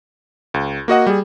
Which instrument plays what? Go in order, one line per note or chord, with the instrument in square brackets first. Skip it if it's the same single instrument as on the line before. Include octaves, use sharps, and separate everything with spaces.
[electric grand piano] C#2
A#3 F#4 D#5 F#5
G3 G#4